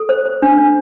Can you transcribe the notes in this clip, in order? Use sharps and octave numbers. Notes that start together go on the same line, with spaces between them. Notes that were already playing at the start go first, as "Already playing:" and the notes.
Already playing: A4
C5
C5
D4
D4